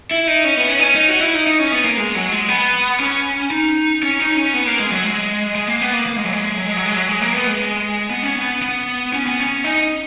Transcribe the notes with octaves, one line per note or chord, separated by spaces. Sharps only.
E4
D#4
C#4
B3
C#4
D#4
C#4
D#4
F#4
E4
D#4
D#4
C#4
B3
A#3
G#3
F#3
G#3
B3
C#4
D#4
C#4
D#4
C#4
B3
A#3
G#3
F#3
G#3
G#3
A#3
B3
A#3
A#3
G#3
F#3
G#3
F#3
G#3
F#3
G#3
F#3
G#3
A#3
B3
G#3
B3
C#4
B3
B3
C#4
B3
C#4
D#4